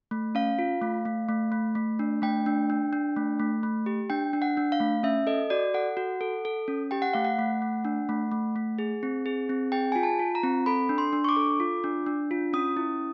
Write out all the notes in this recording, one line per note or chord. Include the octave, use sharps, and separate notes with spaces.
A3
C#4 F5
F4
A3
A3
A3
A3
A3
D4
A3 G5
D4
D4
D4
A3
A3
A3
G4
D4 G5
D4
F#5
D4
F5
A3
C#4 E5
A4 D#5
F#4 D5
A4 F#5
F#4
A4
A4
C#4
G4 G5
F#5
A3 F5
F#5
A3
A3
D4
A3
A3
A3
G#4
C4
G#4
C4
G#4 G5
F4 G#5
A5
F4
A#5
C4
A4 B5
D4
C6
D4
C#6
D6
A4
F4
D4
D4
F4
C#4 D#6
E4